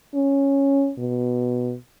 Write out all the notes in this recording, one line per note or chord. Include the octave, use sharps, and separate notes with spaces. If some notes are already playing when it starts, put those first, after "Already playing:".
C#4
B2